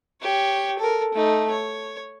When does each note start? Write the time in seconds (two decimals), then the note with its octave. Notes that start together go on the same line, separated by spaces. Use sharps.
0.21 G4 C#5
0.79 A4 A#4
1.14 A3 D#4
1.51 C#5